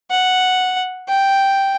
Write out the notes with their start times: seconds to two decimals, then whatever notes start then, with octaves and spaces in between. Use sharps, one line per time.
0.11 F#5
1.08 G5